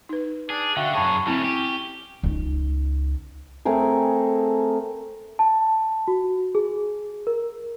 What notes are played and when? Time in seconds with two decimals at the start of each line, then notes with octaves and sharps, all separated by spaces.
0.09 D#4 B4
0.50 D4 G#4
0.77 D3 F#4 E5 F5 G5
0.95 F#2 G#4 C#5 A5 B5 C#6
1.27 F#3 A3 C4 C#4 E4
1.45 G4
2.23 C#2 D#4
3.65 A3 C4 G#4 A#4
5.39 A5
6.08 F#4
6.55 G#4
7.27 A#4